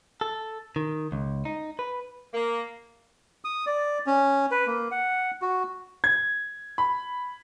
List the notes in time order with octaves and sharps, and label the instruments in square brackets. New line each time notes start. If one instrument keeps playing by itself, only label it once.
[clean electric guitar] A4
D#3
C#2
D#4
B4
[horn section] A#3
[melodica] D#6
D5
C#4
B4
A#3
F#5
F#4
[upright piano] G#6
B5